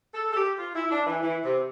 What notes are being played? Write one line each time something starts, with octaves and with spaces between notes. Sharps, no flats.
A4
A4
G4
F4
E4
D4
E3
E3
C3